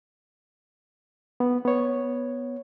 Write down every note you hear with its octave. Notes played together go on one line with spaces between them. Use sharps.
B3
B3 C#5